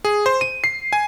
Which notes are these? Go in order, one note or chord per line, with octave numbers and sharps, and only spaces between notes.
G#4
C5
D#7
C7
G#5